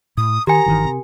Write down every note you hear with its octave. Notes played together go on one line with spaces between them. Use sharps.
A2 D#6
D#3 G4 A#4 G#5 A#5
G1 D#3 E3
C3